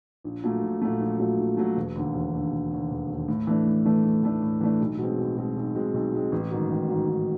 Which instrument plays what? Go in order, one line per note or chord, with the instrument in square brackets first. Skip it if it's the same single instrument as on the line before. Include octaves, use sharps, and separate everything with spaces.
[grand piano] A#1
A#2 F#3 A3
A#1
A#2 F#3 A3
A#1
A#2 F#3 A3
A#1
A#2 F#3 A3
E1
D#2 D3
E1
D#2 D3
E1
D#2 D3
E1
D#2 D3
A2
E3 A3 D4
A2
E3 A3 D4
A2
E3 A3 D4
A2
E3 A3 D4
B1
B2 G#3 C4
B1
B2 G#3 C4
B1
B2 G#3 C4
B1
B2 G#3 C4
A1
G#2 D#3 F#3
A1
G#2 D#3 F#3
A1